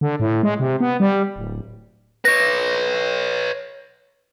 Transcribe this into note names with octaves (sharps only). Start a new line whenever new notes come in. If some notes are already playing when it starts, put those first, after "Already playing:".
D3
A2
G#3
C3
B3
G3
D1
B4 C#5 A#6